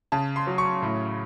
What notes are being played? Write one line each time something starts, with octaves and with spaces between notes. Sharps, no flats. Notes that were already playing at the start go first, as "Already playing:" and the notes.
C#3 A5
C6
F#3
C#6
A2